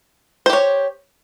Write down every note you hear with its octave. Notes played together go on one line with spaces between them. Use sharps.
G4 C5 C#5